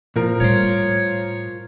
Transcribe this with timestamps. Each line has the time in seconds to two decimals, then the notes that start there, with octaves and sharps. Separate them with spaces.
0.16 A#2 F3 A#4
0.40 A2 G3 F4 C5 C#5